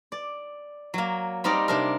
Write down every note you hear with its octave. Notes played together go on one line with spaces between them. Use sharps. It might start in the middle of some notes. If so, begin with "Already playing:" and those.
D5
F#3 A#3
G3 C4 D#4 A#4 D5
C3 D4 A#4